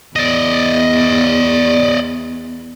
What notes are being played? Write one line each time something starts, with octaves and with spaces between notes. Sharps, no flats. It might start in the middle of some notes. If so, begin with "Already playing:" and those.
E2 D5 D#5